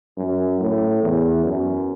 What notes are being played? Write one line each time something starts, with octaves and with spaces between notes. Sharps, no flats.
F#2
A2
E2
F#2